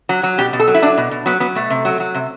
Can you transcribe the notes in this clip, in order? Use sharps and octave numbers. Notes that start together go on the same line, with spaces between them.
F#3
F#3
B2 G4
B2
A4
F#3
E4
F#3 D4
B2
B2
F#3 B3
F#3 B3
B2 A3
C3
F#3
F#3
C3